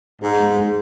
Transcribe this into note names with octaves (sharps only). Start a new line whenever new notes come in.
G#2 G#4
G#3
G#3